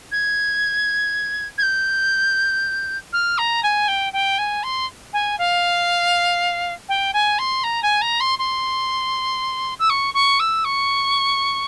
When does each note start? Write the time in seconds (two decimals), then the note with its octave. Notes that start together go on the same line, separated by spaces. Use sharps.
0.12 G#6
1.58 G#6
1.62 G6
3.13 F6
3.38 A#5
3.63 G#5
3.88 G5
4.13 G5
4.38 G#5
4.63 C6
5.13 G#5
5.38 F5
6.89 G5
7.13 G#5
7.38 C6
7.63 A#5
7.83 G#5
8.01 A#5
8.20 C6
8.39 C6
9.79 E6
9.90 C#6
10.14 C#6
10.40 E6
10.64 C#6